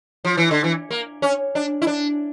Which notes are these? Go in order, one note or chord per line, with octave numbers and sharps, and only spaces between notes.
F3
E3
D3
E3
A#3
C#4
D4
E4
D4